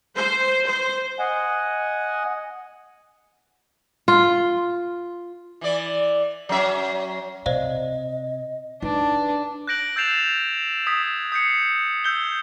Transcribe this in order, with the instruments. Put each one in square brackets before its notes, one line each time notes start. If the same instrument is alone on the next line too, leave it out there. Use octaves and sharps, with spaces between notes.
[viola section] C5
C5
[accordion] D#5 F#5 G#5
[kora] F4
[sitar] E3 D5
F#3 C#4 E5
[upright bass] C3 [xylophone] C5 D5 F5 [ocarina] D#5
[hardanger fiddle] D4 [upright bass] D#4 [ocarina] B4
[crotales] F#6 G6 A#6 D7 F#7
E6 G6 A6 C7 E7 F7
D#6 G#6 B6 E7
D#6 G6 C7 C#7
E6 G6 G7